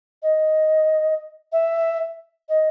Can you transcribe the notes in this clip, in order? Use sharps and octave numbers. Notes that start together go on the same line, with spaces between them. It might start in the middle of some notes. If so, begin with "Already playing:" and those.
D#5
E5
D#5